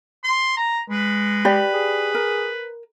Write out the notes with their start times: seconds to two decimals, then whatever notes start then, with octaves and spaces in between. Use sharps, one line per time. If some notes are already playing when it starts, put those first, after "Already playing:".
0.24 C6
0.57 A#5
0.90 G#3 B4
1.45 G4 D5 B5
1.74 G#4
2.15 A#4